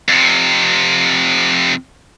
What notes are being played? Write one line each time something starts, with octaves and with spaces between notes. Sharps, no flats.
F2 C3